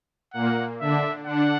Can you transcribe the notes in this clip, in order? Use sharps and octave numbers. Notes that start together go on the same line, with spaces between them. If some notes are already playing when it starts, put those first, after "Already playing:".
A#2 A#3 F#5
D3 D4 E5
D3 D4 F#5